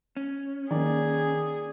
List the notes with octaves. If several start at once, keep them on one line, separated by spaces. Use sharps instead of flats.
C#4
D#3 A#3 G#4 D5